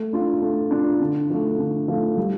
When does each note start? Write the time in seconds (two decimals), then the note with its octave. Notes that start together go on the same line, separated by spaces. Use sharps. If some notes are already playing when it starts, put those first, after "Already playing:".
Already playing: A3
0.13 D4 F4
0.42 A3
0.71 D4 F4
1.00 D3
1.30 F3 A3
1.59 D3
1.88 F3 A3
2.17 G3